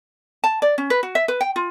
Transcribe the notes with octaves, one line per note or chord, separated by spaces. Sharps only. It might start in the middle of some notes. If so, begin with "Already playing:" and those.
A5
D5
C#4
B4
F#4
E5
B4
G5
F4